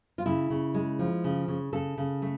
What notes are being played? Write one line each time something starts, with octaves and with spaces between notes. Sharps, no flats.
F4
C#3 E4
C#3
G#3
F3
C#3
C#3
C#3 A4
C#3
A3